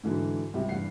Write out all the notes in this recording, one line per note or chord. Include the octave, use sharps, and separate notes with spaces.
G#2 D3 E3 F#3
C#2 C3 G3
E2 G2 F#5 C7